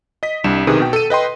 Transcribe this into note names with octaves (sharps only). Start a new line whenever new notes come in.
D#5 B6
C2 G3 D4 E7
B1 C3 D#3 G#4 B4
B2 G5
A4 A5 D#7
B4 D#5 G5 C6